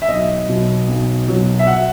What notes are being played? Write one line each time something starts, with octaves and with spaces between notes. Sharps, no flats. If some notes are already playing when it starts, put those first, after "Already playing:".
E5
B1 D#5
B2 F#3
B1
B2 F#3
E5
F#5